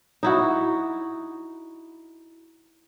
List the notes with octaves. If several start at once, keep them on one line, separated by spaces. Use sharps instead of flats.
D#4 E4 F#4